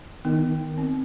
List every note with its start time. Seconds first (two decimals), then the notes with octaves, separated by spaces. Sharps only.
0.25 D#3 B3
0.78 C4